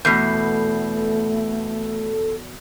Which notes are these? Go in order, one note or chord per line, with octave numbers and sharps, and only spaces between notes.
E2 B2 A3 A4 G6 C7